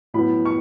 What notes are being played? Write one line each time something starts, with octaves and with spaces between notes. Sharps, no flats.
A2 F#3 B3 B5
C#6